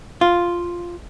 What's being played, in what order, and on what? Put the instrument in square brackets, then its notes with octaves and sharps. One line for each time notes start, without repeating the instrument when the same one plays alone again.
[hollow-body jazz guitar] F4